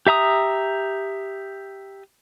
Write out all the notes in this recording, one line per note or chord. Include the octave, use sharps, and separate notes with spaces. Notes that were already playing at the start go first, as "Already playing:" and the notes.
G4 E5 A#5 D#6